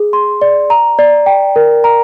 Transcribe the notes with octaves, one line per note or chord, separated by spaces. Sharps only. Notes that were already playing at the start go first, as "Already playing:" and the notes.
Already playing: G#4
C6
D5
A#5
D5
G5
A#4
A#5